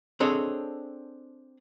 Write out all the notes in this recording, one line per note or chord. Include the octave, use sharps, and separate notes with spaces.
C4 D4 G#4 A4 C#5 D#5